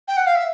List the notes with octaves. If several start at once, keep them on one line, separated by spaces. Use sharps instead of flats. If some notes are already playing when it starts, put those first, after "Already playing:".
G5
F#5
F5
E5